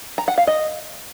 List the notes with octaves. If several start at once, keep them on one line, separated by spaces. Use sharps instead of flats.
A#5
F#5
F5
D#5